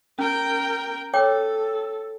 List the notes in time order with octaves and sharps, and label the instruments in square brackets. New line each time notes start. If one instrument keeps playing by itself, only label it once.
[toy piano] C#4 [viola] A#4 G5
[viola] A4 [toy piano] C#5 G5 D6